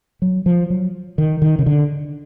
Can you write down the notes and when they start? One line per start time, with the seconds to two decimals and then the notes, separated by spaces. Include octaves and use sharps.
0.22 F#3
0.46 F3
0.70 F#3
1.18 D#3
1.42 D#3
1.59 C#3
1.66 D3